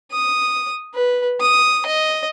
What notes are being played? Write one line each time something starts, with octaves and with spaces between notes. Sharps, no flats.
D#6
B4
D#6
D#5